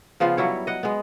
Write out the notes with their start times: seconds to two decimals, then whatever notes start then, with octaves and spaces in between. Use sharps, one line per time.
0.20 C#3 F3 B3 F4
0.37 F#3 G3 E4 C#5
0.67 D#5 F#5
0.83 G#3 B3